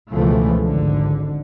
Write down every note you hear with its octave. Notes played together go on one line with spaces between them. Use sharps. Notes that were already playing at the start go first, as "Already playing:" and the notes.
C#2 B2 E3 F3 A3
G#1 D3